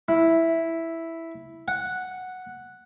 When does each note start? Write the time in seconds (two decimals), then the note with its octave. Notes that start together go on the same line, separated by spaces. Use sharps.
0.08 E4
1.68 F#5